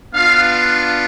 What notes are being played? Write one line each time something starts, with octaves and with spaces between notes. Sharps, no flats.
B3 D4 F4 F5